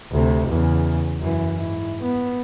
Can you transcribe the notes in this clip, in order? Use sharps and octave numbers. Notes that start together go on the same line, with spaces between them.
D2 C3
E2 C#3
F#2 E3
G#2 E4
B3